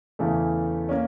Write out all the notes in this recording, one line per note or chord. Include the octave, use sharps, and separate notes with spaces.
E2 C#3 E3 A3
A#3 C#4